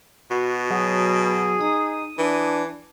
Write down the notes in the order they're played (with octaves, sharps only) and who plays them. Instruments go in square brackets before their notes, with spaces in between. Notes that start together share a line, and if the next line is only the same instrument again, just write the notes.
[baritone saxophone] B2 [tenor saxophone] F#4
[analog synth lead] F#3 [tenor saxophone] G#4
[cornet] D#4 [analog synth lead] D#6
[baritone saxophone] E3 [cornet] D4